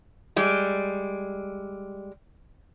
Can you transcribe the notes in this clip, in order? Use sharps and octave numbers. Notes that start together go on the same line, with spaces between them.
G3 G#3